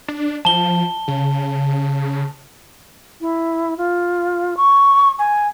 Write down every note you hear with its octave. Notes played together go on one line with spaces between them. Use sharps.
D4
F3 A5 G7
C#3
E4
F4
C#6
G#5